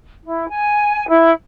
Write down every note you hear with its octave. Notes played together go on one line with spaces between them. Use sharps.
E4
G#5
E4